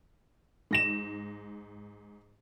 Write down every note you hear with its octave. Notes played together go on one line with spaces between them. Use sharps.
G#2 A#6 E7